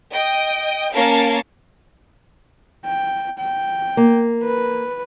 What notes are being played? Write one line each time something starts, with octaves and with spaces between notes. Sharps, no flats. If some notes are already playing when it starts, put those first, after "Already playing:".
D#5 G5 D#6
A#3 C#4 A#4 C#5 F5 A5
G5
G5
A#3
B4